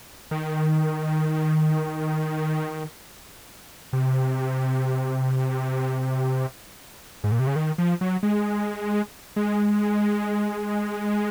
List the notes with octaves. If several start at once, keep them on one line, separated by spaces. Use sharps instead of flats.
D#3
C3
G#2
A#2
C3
C#3
D#3
F3
F#3
G#3
G#3